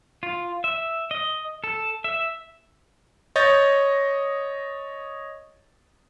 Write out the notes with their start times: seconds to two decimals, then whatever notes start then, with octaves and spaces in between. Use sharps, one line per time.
0.23 F4
0.64 E5
1.11 D#5
1.64 A4
2.04 E5
3.36 C#5 D#5 G6 A6